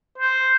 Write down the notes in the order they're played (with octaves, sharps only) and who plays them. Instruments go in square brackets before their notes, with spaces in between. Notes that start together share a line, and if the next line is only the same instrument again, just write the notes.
[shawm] C5